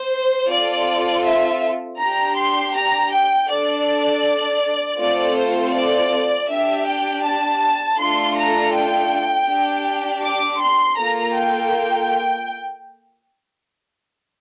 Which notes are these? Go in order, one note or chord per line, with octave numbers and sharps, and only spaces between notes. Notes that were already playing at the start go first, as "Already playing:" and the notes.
Already playing: C5
C4 F4 A4 D5
E5
D4 G4 A#5
C6
A#5
G5
D4 A4 D5
A3 C4 F4 A4 D5
C5
D5
D4 G4 E5
G5
A5
A3 D4 F4 A4 C6
A#5
G5
D4 G4
D6
C6
A#3 F4 A4 A#5
G5